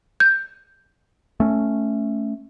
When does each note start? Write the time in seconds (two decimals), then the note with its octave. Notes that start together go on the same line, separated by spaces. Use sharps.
0.20 G6
1.40 A3 C#4